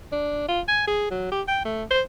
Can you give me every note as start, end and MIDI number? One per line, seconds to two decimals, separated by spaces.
0.12 0.48 62
0.48 0.61 65
0.68 0.83 80
0.87 1.10 68
1.11 1.28 54
1.32 1.42 67
1.48 1.61 79
1.65 1.83 57
1.91 2.02 72